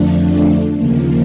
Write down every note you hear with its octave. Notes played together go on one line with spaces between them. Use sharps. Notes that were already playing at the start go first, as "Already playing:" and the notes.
Already playing: F2 D3 F3 A3 D4
D#2 C#3 F3 A#3